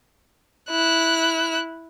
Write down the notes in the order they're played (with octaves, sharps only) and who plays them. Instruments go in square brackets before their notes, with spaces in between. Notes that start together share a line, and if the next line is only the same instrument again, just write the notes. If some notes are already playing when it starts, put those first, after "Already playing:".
[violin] E4 F#6